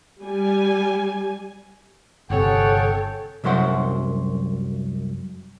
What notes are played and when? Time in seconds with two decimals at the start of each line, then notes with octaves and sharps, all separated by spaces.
0.22 G3 G#5
2.30 G1 C3 G#4 A4 C#5 F#5 G5
3.44 C2 F#2 F#3 C5 F#5